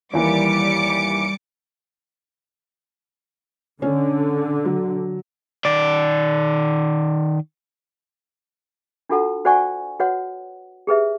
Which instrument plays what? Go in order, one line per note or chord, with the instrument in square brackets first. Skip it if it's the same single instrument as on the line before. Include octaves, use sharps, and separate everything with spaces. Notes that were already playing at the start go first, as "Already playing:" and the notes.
[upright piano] D#2 E3 A#3 [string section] G3 D6 C#7
[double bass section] D3 [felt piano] C#4
[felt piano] F#3
[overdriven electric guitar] D#3 D5
[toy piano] D4 F4 F#4 A4 F#5 A5
F#4 C5 D5 F#5 G#5 C#6
F#4 B4 C#5 F#5
G4 G#4 B4 E5